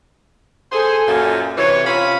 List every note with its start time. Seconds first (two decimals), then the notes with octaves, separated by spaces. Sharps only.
0.72 G#4 A4 C5 G#5
1.08 F#2 A#2
1.58 C3 E3 C#5
1.87 C3 C#4 F4 F5 B5